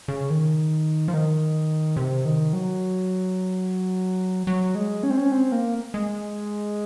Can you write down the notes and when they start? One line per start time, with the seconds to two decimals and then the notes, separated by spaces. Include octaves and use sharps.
0.08 C#3
0.30 D#3
1.08 F3
1.14 D#3
1.97 C3
2.25 D#3
2.53 F#3
4.47 F#3
4.75 G#3
5.03 C#4
5.10 C4
5.17 C#4
5.32 C4
5.52 A#3
5.94 G#3